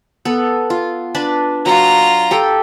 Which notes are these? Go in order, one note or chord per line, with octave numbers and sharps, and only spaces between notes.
B3 A4
F4
D4 B4 A5
F#3 F4 A#5
G4 A4 G5